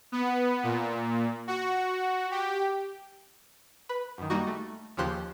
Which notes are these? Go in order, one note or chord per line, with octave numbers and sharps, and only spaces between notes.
B3
A#2
F#4
G4
B4
F#2 D#3
G3 A#3 D#4 F#4
A3
D#2 C#3 F3 G4 C5 F#6